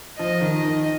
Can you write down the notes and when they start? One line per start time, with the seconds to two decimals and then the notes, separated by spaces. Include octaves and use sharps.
0.18 F3 D#5
0.41 D#3
0.53 D#5
0.63 D#3